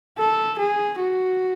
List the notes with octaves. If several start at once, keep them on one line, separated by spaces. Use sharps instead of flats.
A4
G#4
F#4